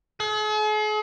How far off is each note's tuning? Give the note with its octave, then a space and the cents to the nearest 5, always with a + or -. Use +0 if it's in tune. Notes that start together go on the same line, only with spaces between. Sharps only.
G#4 +45